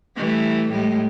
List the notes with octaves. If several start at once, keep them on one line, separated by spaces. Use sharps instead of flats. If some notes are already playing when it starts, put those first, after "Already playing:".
E3 G3 A3
A2 G3 G#3